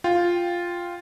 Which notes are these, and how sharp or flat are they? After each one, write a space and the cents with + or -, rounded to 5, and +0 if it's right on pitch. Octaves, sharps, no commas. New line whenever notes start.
F4 +0 G5 +0